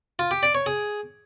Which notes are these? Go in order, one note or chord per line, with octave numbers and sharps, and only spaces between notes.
F4
G4
D5
C#5
G#4